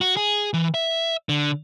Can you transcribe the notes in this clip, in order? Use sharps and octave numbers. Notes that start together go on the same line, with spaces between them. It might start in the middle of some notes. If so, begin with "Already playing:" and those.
F#4
G#4
E3
E5
D3